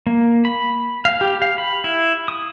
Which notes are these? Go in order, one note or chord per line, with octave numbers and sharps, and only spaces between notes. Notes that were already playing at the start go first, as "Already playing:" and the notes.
A#3
B5
F5
G4
F5
B5
E4
D#6